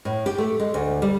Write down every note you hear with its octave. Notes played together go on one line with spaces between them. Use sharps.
A2
G4
A3
G#3
D2
G3